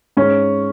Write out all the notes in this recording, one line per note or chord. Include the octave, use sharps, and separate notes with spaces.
G#2 C#4